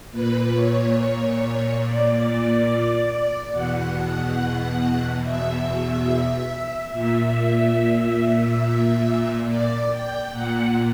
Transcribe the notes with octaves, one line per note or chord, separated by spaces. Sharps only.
A#2 B4
C#5
D5
E2 B2 F#5
E5
A#2 E5
D5
G5
A#2 F#5